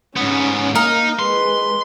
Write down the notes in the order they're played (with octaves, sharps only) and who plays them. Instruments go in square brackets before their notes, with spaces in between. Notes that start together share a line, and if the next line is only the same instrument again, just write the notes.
[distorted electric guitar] G#2 B3 [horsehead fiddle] C#4
[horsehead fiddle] A#3 [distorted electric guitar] D#4 [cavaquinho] A#4
[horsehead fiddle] G#3 B4 [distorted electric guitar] C6